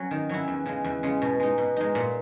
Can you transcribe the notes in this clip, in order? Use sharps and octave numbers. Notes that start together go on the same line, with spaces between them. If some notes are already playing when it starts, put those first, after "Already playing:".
Already playing: F#3 C#4
D#3
F#3 C#4 E4
E2
C#3 G#3
E2
C#3 G#3
B2
G#3 D#4
B2
G#3 D#4
A#2